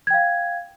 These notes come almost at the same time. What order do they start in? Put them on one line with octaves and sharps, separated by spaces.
G#6 G5 F5